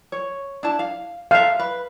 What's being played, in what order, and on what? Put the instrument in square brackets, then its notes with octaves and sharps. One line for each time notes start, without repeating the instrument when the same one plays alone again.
[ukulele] C#5
D4 E4 A5
F5
[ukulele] A4 E5 [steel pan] F5
[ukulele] B4